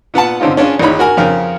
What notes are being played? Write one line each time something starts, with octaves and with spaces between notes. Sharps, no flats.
A#2 B3 F#5 A5
D3 C4 C#4 D#4 F4
C#4 D4 F4 G#4
A#1 D#2 E3 D#4 C#5 B5
F#4 A#4 G#5
F2 C#3 A#4